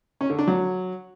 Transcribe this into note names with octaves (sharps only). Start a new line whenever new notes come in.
C#4
D3
D4
F#3